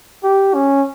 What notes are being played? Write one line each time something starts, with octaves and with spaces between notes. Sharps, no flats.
G4
C#4